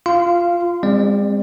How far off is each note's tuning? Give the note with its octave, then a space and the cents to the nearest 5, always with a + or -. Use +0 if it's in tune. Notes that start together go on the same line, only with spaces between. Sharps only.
F4 +0 F5 -15 C6 -25
G#3 -40 C4 +0 D5 +20